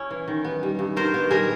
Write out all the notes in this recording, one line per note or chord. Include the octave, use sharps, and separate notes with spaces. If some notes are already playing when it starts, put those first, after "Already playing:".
Already playing: C#4 E4
E3
D#3
B3
G3
G2
D#3 A#4 C5
B3
G3 G#4 A#4